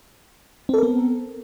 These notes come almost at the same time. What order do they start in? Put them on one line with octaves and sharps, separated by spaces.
C4 A4 A#4 B3